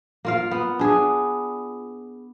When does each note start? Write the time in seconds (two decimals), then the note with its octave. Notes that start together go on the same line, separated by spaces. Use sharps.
0.25 A#3 F4 F5
0.51 B3
0.79 D4 G#4